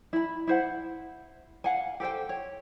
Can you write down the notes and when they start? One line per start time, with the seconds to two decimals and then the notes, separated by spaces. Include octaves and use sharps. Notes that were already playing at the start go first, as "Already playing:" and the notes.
0.13 E4 B5
0.47 E4 C5 F#5
1.64 F5 F#5 G#5
2.00 G4 A4 C5 G5
2.29 C#5